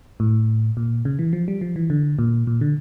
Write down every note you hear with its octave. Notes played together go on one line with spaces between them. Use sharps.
A2
A#2
C#3
E3
F3
G3
F3
E3
D3
A#2
A#2
D3